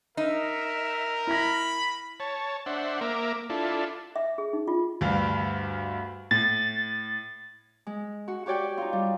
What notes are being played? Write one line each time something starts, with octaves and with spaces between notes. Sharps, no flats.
D#4 A#4 E5
E4 B5 A#6
C#5 A5
D4 C5 E5 F#5
A#3 A#4 E5 D6
D4 E4 F4 A4
E5
G#4
D#4
F4
D2 G2 F5
A2 A6
G#3
F#4
F#4 G4 C#5 D5 G5
D#4 F4
G3